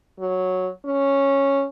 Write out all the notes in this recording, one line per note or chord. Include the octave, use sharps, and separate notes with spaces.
F#3
C#4